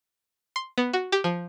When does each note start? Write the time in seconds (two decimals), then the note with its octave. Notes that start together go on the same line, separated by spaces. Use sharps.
0.56 C6
0.78 B3
0.93 F#4
1.12 G4
1.24 F3